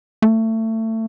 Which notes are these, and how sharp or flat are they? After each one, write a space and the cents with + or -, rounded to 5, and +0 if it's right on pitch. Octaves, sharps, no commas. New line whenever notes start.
A3 +25